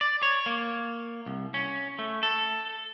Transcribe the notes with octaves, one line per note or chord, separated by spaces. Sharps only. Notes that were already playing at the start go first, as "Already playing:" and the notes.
D5
C#5
A#3
C2
C#4
A3
A4